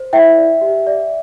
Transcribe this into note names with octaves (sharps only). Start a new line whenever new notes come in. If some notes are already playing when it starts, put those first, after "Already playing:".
Already playing: C5
E4 E5 G5
D5
G4
D5